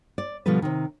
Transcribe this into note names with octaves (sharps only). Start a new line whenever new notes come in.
D5
B2 D3 F3 G3 A4 B4
C3 D#3